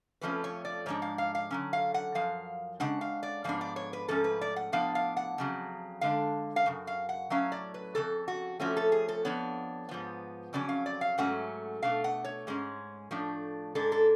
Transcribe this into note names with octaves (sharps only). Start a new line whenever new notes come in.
F2 F3 A3 C#4 B4
C#5
D5
G#2 F3 G#3 D4 C#5
F5
F5
F5
D3 F#3 C#4
F5
F#5
F#2 F3 F5
C#3 G#3 D4 F#5
F5
D5
G#2 F3 B3 D4 F5
D5
C#5
B4
G#2 F3 A3 C#4 A4
B4
D5
F#5
A2 F3 B3 D4 F5
F5
F#5
F2 C#3 F#3
D3 G#3 D4 F5
F5
F#2 C#3
F5
F#5
A2 F#3 C#4 F5
D5
B4
F2 C#3 A4
F#4
F2 F3 A3 C#4 F#4
A4
G#4
A4
F2 F3 B3 D4 C#5
G#2 F3 B3
F2 C#3 F#3 C#4 D5
F5
D5
F5
G#2 F#3 A3 C#4 F#5
B2 A3 D4 F5
F#5
C#5
G#2 G#3 C#4
A2 F3 A3 D4
G#2 G#3 D4 A4
A4